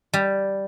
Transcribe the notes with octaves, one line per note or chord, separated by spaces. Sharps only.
G3